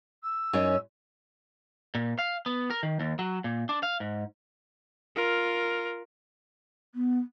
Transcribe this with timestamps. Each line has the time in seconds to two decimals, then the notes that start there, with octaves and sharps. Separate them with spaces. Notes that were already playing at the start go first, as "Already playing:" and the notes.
0.23 E6
0.53 F#2 C#4 D#4
1.95 A#2
2.19 F5
2.46 B3
2.70 A#4
2.83 D#3
3.00 D#2
3.19 F#3
3.44 A#2
3.69 D4
3.83 F5
4.00 G#2
5.16 F4 A#4
6.95 B3